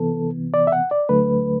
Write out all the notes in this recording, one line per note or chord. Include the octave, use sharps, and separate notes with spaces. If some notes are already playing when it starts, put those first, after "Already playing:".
Already playing: C2 C3 E3 B3 A4
D5
E5
F#5
D5
D2 D3 F#3 A3 B4